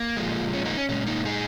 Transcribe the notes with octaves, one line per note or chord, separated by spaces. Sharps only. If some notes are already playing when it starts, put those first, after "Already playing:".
Already playing: A#3
A#2 F3 G#3
C#4
A#3 D#4
C#4
A#2 G#3 C#4
A#3 D#4
D#4 G#4